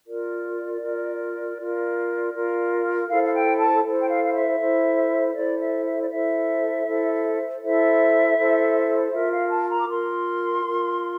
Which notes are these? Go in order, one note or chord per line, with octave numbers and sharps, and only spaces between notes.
F4 A#4 D5
F4 A#4
F4 A#4
F4 A#4
E4 A4 C5 F5
F5
G5
A5
E4 A4 C5
G5
F5
F5
E5
E4 A4 C5
E4 A4 C5 D5
E5
E5
D5
E4 A4 C5 E5
E4 A4 C5
E4 A4 C5 E5
E4 A4 C5
F4 A#4 E5
F5
A5
A#5
D6
F4 A#4 C6
F4 A#4